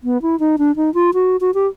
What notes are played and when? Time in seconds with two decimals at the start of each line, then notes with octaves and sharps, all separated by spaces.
0.04 B3
0.22 E4
0.40 D#4
0.58 D4
0.76 D#4
0.94 F4
1.14 F#4
1.41 F#4
1.54 G4